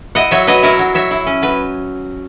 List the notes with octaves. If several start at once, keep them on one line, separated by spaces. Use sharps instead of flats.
E4 D#5 F#5
F#3 C#5 E5
F#3 B4 D#5
E4 A#4 C#5
F#3
F#3 C#5 E5
E4
C#4
F#3 B4